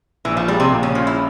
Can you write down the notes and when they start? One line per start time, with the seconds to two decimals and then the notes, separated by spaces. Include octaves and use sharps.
0.25 A#1 E3
0.37 F3
0.48 G3 G#3
0.60 C3
0.72 A#2
0.83 C#3
0.95 F3 C#4
1.07 E4